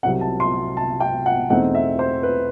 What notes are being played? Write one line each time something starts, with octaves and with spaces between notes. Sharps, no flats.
C2 C3 F#3 C4 F#5
A5
C6
A5
G5
F#5
E2 B2 A3 C4 D#4 F#5
E5
C5
B4